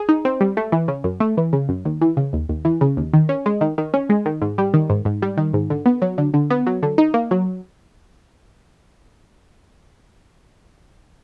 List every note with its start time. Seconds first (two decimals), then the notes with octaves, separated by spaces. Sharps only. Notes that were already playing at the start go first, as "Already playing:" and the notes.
Already playing: G#4
0.09 D#4
0.25 C4
0.41 G3
0.57 A3
0.72 E3
0.88 C#3
1.04 F#2
1.20 A3
1.37 E3
1.53 C#3
1.69 F#2
1.85 D#2
2.01 E3
2.17 C#3
2.33 D#2
2.49 D#2
2.65 E3
2.81 C#3
2.97 D#2
3.13 D#3
3.29 C#4
3.46 G#3
3.61 D#3
3.78 D#3
3.94 C#4
4.09 G#3
4.26 D#3
4.42 G#2
4.58 G3
4.74 D#3
4.90 G#2
5.05 G#2
5.22 G3
5.37 D#3
5.54 G#2
5.70 D3
5.86 B3
6.02 F#3
6.18 D3
6.34 D3
6.50 B3
6.67 F#3
6.83 D3
6.98 D#4
7.14 A#3
7.31 F#3